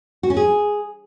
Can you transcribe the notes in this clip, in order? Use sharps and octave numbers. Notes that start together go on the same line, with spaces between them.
F#4
C#4
G#4